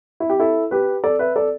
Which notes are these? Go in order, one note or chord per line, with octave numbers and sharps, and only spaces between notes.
E4
G4
E4 A4
G4 B4
A4 D5
B4 E5
A4 D5